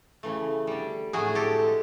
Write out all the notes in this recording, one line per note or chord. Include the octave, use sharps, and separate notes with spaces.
C#3 E3 A3
D3 G3
A2 F#3 A3 F#4 G#4
G4 A4
B2 G#3